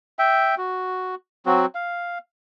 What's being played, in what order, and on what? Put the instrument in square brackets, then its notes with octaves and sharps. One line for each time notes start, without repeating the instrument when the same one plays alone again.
[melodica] E5 G5
F#4
F#3 C4 F#4
F5